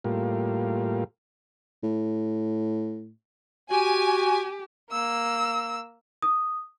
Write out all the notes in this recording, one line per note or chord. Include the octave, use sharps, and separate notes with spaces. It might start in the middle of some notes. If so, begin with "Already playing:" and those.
A2 G3 A#3 F4
A2
F#4 G4 G#5
A#3 E6
D#6